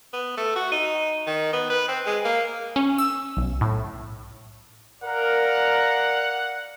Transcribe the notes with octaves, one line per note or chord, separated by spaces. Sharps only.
B3
A3
F#4
D#4
D#3
B3
B4
C4
G#3
A#3
C#4
E6
B1
A2
A#4 D5 F5 F#5